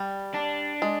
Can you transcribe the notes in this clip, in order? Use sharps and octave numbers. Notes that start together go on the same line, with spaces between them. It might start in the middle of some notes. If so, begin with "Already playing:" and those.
Already playing: G3
D4
G#3